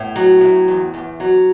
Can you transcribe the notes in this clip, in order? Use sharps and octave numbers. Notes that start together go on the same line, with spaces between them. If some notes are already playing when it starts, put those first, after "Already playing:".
Already playing: A2 B3
F#3
A2
E2
E2
F#3